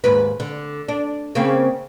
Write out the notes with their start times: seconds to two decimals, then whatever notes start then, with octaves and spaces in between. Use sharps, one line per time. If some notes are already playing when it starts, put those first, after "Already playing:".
0.04 D#2 G#2 B4
0.40 D3
0.88 D4
1.35 C#3 A#3 C4